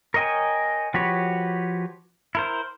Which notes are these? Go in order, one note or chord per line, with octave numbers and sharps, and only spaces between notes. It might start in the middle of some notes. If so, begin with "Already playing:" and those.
A#4 C#5 D#5 G5 G#5
F3 F#4 G4 B4 C#5
E4 A#4 C5